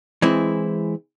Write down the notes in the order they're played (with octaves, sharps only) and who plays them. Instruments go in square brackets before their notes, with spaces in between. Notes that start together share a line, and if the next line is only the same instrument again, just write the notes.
[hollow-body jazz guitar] E3 G#3 C4 E4